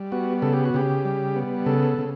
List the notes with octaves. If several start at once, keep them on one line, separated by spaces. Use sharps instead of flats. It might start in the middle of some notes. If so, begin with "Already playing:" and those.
Already playing: G3
B3 F#4
C#3 A4
G4
F#4
C#3 G4
G3
B3
C#3 A4
C#3